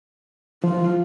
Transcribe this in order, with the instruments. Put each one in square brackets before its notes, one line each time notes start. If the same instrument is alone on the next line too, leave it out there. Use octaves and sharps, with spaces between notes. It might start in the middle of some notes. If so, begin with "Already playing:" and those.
[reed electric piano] F3 [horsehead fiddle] F4